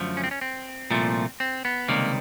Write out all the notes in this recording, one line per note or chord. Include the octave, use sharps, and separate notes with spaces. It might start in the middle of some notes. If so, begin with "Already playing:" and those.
Already playing: F#2 D3 F3 A3
C#4
C4
C#4
C4
C2 A#2 F3 A3
C4
B3
C#2 C3 D#3 G3 A#3